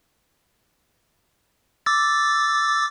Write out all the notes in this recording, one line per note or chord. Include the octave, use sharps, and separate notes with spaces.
D6 E6 A6